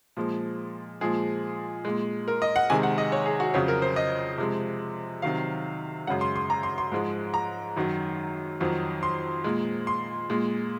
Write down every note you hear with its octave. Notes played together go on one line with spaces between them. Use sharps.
A#2 F3 G#3
A#2 F3 G#3 G#4
A#2 G#3
A#4
D#5
F#5
C3 D#3 G#3 G#5
F#5
D#5
C#5
G#4
F#4
F2 C#3 F#3 C#5
A#4
C5
D#5
C3 F3 G#3
C3 D#3 F#3 F5
F#2 C#3 G#3 F#5
C6
C6
A#5
C6
C6
G#2 F3 G#3
A#5
F#2 D#3 F#3
F2 D#3 F#3
C6
A#2 G#3
C6
A#2 G#3